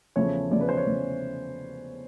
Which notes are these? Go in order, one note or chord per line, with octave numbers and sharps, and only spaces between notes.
E2 C#3 F3 A3 C#5
E2 C#3 F3 A3 D5
B4
C5
C#5
E2 C#3 F3 A3